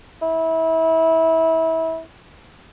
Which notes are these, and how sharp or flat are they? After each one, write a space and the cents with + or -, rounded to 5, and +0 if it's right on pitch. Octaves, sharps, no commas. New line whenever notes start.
E4 -25